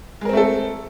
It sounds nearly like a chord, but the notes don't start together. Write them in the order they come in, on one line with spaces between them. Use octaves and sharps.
G#3 A#4 C4 A3 A4